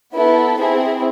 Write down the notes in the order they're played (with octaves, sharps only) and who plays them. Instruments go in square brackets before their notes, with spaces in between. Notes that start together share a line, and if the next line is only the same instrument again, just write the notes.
[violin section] B3 E4 A4
C4 E4 G#4